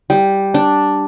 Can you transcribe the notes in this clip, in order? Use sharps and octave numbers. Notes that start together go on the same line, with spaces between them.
G3
D4